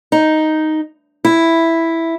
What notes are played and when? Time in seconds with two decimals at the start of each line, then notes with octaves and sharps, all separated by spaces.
0.12 D#4
1.25 E4